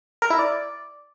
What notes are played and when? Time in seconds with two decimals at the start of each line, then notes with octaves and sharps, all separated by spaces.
0.22 A#4
0.30 E4
0.39 D5